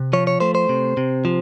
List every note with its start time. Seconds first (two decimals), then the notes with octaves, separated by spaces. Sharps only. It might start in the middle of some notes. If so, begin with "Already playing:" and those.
Already playing: C3
0.13 F3 C#5
0.27 C#5
0.40 A3 C5
0.55 C5
0.69 C3
0.97 C3
1.25 F3